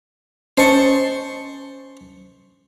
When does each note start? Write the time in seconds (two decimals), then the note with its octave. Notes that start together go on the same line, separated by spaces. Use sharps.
0.58 C#4 C5 D#5 A5 C#6